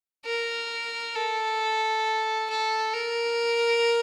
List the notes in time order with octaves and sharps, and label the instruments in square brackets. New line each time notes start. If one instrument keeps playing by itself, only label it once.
[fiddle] A#4
A4
A4
A#4